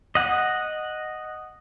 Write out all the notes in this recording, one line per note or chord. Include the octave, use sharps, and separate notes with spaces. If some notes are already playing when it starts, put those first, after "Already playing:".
D#5 F#5